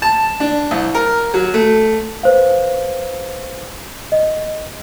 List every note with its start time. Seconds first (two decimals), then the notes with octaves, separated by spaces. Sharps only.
0.02 A5
0.40 D4
0.71 C2
0.94 A#4
1.34 F#3
1.54 A3
2.23 B4 C5 F5
4.12 D#5